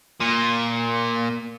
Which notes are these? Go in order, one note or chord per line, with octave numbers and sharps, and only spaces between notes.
A#2